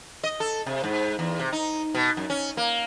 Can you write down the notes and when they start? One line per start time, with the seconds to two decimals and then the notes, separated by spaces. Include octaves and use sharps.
0.24 D#5
0.40 A4
0.66 C3
0.84 G#2
1.19 E2
1.40 C3
1.52 D#4
1.95 B2
2.17 F#2
2.30 C#4
2.57 A#3